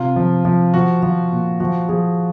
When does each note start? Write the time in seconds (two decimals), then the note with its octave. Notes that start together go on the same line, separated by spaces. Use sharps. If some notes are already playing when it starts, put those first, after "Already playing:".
Already playing: C3 F4
0.16 F3
0.45 F3
0.74 F3 F#4
1.03 F3
1.32 A#2
1.60 F3 F#4
1.88 F3 G#4